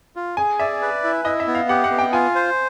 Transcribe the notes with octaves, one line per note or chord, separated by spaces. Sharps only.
F4
G#4 G#5
D5 E5
B4
E4
E4 D#5
E5
B3
F5
G4 F#5
F#5
B3
G5
F4 G#5
C5